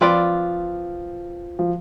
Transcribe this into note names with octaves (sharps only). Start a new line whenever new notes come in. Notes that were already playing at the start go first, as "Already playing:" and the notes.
F3 C4 F4 B4 D5
F3